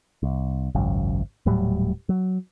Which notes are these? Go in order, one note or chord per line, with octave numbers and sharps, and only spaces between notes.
C2
G#1 C#2 F#2
D#1 A2 F#3 G3
F#3